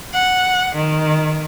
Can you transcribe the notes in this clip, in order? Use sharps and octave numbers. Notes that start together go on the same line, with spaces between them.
F#5
D#3